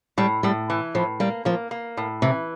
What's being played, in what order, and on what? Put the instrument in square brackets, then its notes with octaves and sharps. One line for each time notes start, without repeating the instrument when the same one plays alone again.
[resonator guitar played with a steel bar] A2 [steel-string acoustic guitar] G3
[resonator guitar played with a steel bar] A2 [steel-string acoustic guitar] G3
[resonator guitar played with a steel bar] E3
[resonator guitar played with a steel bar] A2 [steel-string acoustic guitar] F3
[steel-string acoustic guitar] G3 [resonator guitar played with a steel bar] A#3
[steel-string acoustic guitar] F3 [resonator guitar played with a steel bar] A#3
[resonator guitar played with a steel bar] A#3
A2
[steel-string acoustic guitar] C3 [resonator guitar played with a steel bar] E3